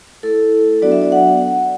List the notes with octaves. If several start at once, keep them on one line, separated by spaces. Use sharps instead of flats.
A3 E4 A4
F#3 B3 D4 F#4 D5
E5
D5
F#5